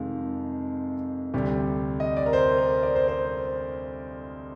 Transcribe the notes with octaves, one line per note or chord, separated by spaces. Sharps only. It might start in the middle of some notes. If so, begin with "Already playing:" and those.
Already playing: F2 C3 D#3 G#3 F5
D2 C3 G3
D#5
D5
A#4
C5
A#4
D5
C5
C5